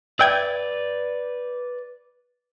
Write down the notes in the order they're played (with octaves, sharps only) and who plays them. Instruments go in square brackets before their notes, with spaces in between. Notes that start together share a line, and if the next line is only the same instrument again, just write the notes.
[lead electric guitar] B4 D5 [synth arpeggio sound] E5 G5 G#6